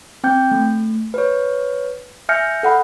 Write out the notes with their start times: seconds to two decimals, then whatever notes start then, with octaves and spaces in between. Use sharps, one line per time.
0.24 C4 G5 G6
0.51 A3
1.14 B4 C#5
2.29 E5 G#5 F6 G6 A#6 C#7
2.63 A4 F#5 B5